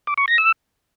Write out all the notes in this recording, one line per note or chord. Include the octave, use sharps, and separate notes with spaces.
D6
C#6
A#6
E6